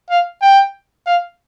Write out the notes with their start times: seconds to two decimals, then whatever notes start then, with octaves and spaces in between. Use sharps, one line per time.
0.10 F5
0.42 G5
1.07 F5